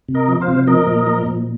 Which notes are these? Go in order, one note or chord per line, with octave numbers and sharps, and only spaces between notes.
C3
A#4 D#5
F3
C5 F5
C3
F3 A#4 D#5
A#2
F3
A#2